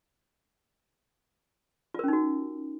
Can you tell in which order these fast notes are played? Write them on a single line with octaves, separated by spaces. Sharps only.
F4 A#4 C#4 D#4 F#4